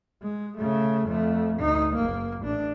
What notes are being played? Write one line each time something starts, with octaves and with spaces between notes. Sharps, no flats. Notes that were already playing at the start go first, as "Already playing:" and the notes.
G#3
C#3 A3
F2 A3
D2 D#4
F#1 A#3
A1 D4